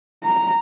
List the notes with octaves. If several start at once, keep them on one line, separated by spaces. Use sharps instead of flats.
A#5